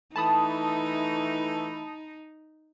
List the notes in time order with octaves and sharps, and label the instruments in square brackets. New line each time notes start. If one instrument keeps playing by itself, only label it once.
[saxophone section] E3 A3 [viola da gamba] D#4 [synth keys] A5 B5 D#6